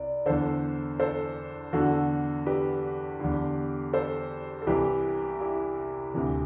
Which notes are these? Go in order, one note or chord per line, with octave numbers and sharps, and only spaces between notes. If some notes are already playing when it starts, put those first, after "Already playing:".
Already playing: C2 D5
E2 D3 A4 C5
A4 C5
E2 D3 F#4 A4
G4 B4
E2 D3
A4 C5
A4
C2 C3 E3 G4 B4
E4 G4
D2 C3 E3